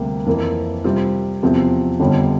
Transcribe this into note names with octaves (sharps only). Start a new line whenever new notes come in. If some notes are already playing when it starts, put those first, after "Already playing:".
Already playing: D2 C3 G3 A#3
F2 E3 A#3 E4 A#4
C3 G3 C4 F4
E2 C3 F3 C4
G1 F2 D3 G3